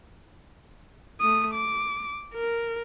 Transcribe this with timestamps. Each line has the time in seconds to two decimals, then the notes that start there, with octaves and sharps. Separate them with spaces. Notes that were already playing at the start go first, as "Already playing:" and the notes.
1.21 A3 D#6
1.54 D6
2.34 A#4